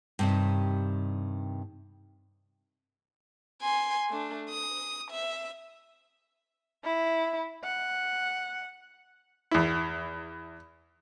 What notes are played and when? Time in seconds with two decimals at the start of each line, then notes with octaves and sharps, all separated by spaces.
0.19 G2 C3 D#3
3.62 G#5 C6
4.09 A3 D4
4.50 D#6
5.11 E5
6.84 E4
7.64 F#5
9.51 E2 E4